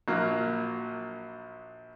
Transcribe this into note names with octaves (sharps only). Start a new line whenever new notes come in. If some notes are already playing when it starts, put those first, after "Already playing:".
A#1 F#3 A#3